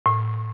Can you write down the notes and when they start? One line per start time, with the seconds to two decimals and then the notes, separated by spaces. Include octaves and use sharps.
0.06 A2